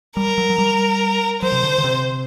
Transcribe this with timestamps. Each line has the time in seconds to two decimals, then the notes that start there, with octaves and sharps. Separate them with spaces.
0.17 G3 A#4
0.38 F#3
0.50 F#3
0.58 G3
1.42 F#3 C5
1.52 C3
1.63 D3
1.78 D3
1.84 C3